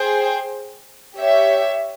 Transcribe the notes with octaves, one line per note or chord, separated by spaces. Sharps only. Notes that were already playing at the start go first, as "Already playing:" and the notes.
Already playing: G#4 C5 G5
G4 C#5 E5